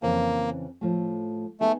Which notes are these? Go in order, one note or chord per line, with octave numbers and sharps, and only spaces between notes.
F2 C#3 E3 A#3
A2 F3 A3
A3 B3 D#4 G#4